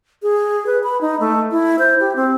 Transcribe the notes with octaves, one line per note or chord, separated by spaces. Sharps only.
G#4
B4
B5
D#4
A3
E4
C5
G4
C4